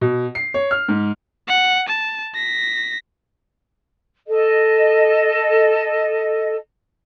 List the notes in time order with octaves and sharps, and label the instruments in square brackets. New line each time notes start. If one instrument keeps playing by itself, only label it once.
[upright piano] B2
C7
C#5
F6
G#2
[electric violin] F#5
A5
A#6 B6
[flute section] A4 D#5